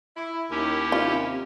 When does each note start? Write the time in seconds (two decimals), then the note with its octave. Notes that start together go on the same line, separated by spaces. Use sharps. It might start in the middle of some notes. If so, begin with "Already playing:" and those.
0.17 E4
0.51 D#2 C#4 E4 G4
0.92 C3 F4